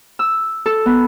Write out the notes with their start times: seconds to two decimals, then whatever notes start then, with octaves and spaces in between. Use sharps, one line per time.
0.19 E6
0.66 A4
0.86 B3